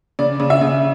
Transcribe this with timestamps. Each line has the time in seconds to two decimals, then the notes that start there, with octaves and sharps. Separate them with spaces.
0.19 C#3 D5
0.40 C#3
0.50 E5
0.61 C#3